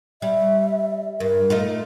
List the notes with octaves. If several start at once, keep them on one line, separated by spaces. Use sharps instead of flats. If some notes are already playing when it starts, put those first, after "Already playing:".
G3 E5
G2 A#4
A3 D#4 F4